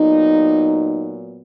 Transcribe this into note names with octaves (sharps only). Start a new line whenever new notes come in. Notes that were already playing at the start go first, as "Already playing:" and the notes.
Already playing: A#2 F#3 B3 D#4